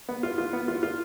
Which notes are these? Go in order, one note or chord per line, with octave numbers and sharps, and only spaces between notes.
B3
F4
F4
B3
F4
F4